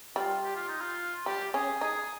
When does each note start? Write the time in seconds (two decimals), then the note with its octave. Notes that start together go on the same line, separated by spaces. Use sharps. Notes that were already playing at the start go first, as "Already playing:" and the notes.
0.16 G3 F4
0.44 G4
0.56 F4
0.68 D#4
0.81 F4
1.26 G3 G4
1.54 C#4 G#4
1.81 D#4 G#4